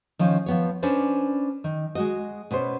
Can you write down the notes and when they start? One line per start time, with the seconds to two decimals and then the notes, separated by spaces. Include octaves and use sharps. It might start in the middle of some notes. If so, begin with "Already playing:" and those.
0.19 D#3 F3 C#4
0.46 F3 B3 C#5
0.83 C#4 D4 B4 C5 D5
1.64 D#3
1.95 G#3 F#4 D#5
2.51 B2 B3 C#4 C5